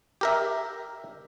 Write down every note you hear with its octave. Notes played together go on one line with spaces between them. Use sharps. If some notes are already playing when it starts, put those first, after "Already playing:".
G4 A#4 E5